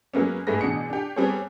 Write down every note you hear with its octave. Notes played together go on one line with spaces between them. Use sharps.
F#3 G#3 A#3 B3 C#4
G#2 G#3 A3 G#4 B4 A#6
A1 B2 D4 G#4 C#7
D4 G4
G3 B3 C4 G#4 A4 C#5